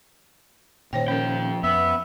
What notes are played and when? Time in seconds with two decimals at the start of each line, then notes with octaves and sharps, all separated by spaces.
0.93 A#2 D#3 C5 C#5 G5
1.08 F3 C#4 A#4 G5
1.63 F2 B3 B4 E5